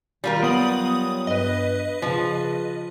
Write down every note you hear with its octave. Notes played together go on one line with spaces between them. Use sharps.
D#3 G3 F4 A#4
F#3 B3 D#6 F#7
G2 B4 D#5
C#3 F3